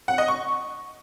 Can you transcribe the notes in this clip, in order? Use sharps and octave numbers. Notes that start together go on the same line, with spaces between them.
F#5
D#5
C#6